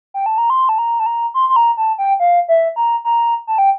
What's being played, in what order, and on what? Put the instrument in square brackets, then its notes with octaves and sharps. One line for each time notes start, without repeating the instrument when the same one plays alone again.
[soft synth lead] G5
A5
A#5
C6
A5
A#5
A5
A#5
C6
C6
A#5
A5
G5
F5
E5
A#5
A#5
A5
G5